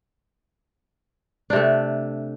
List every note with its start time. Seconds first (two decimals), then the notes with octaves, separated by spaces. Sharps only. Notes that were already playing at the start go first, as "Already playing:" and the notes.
1.50 D4
1.53 C3
1.56 A3